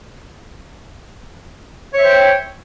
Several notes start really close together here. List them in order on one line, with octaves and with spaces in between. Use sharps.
C#5 E5 C5 G5